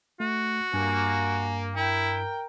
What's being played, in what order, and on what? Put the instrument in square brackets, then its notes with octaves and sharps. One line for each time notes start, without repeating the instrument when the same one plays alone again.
[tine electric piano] A3 [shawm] F#4
[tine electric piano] G2 [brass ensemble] A#3 [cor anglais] G#5
[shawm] E4 [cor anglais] A#4 [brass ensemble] G5